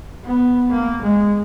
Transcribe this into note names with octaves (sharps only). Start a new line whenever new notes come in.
B3
A#3
G#3